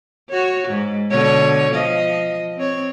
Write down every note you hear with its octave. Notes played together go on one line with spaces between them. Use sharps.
F#4 C#5
G#2
B2 D3 C#5
F3 D#5
C4 C#5